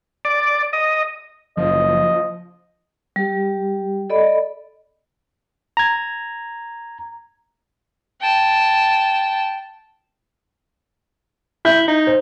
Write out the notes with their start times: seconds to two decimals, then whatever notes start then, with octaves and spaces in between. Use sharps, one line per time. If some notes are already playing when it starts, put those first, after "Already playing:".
0.25 D5
0.73 D#5
1.57 F#1 F3 D#5
3.16 G3 G4
4.10 A4 D5 D#5 B5
5.77 A#5 G#6
8.21 G5 A5
11.65 E4 E5 G6
11.88 D#4
12.07 C5